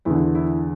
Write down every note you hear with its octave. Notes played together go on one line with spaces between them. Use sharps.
E2 D3 E4
E4